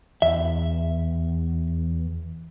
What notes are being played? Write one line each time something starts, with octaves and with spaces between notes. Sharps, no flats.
E2 E5